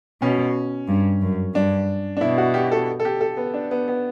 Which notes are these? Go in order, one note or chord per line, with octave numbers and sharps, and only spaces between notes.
B2 C#4
G2
F#2
G2 D4
D4
B2 E4
F#4
G4
A4
A4
G4
A4
B3
D4
B3
B3